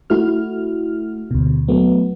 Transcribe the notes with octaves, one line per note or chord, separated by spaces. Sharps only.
A3 E4 F#4 F6
D2 B2
F#3 A3 B3